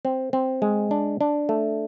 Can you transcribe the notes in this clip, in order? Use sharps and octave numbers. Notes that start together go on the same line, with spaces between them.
C4
C4
G#3
D4
D4
A3